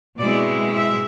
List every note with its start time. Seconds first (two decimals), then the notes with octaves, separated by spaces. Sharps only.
0.19 B2 G#3 C4 E4 D5
0.74 E5